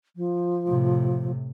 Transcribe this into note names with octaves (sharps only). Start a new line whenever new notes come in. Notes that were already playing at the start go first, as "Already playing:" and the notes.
F3
A2 C3